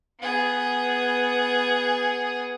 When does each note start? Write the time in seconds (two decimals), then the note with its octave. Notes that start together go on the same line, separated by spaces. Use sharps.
0.20 B3 G#4